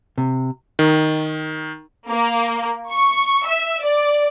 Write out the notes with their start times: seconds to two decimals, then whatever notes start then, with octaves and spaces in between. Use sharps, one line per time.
0.18 C3
0.79 D#3
2.09 A#3
2.89 C#6
3.46 E5
3.82 D5